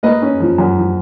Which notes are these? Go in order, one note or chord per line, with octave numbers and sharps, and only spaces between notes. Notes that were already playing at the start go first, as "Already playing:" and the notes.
A#3 B4 D#5
C#4
F3
F#2
F3